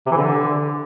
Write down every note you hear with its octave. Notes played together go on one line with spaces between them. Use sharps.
C3
E3
D3